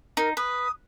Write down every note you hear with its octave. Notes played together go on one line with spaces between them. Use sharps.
D#4 A#4
B4 D#6